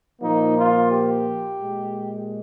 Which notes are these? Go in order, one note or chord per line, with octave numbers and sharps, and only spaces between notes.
A#2 F3 A#3 D#4
F4
G4
A#2 G#3